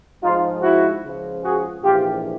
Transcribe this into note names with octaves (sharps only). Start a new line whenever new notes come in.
G#2 F3 G#3 D#4 F4
E4 F#4
C#2 C#3 F3
F#4 G#4
A#1 G#2 E3 F4 G4